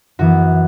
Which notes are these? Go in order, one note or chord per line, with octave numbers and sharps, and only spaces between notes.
F#2 E3 B3 F#4